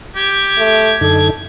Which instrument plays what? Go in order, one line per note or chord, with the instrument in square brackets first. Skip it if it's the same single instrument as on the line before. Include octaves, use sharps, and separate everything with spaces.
[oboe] G4 [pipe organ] G#6
[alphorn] A3
[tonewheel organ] F#2 D3 D#4 [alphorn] A4